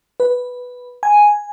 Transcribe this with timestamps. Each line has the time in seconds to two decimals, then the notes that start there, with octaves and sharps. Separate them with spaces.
0.20 B4
1.03 G#5